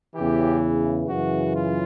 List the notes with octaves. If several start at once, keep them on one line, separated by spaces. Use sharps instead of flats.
E2 C#3 E3 G4
F#2 C#3 E3 F#4
F4